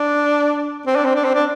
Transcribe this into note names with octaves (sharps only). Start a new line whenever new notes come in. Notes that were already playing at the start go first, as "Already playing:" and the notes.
Already playing: D4
C4
D4
C4
D4
C4
D4